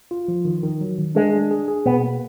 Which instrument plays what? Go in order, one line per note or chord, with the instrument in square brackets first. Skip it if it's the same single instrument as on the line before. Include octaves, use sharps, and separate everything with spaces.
[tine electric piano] F4
F3
D#3
D#3
F#3
D#3
[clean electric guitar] G#3 [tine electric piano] D4
[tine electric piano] D4
G#4
G#4
[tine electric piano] B2 [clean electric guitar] B3
[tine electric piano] A#3